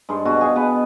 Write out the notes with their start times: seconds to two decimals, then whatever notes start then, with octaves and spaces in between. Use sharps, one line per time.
0.09 G2 G#3 D4 C5
0.25 B2 D4 F#4
0.41 G#4 F5 G#5
0.56 B2 B4 F#5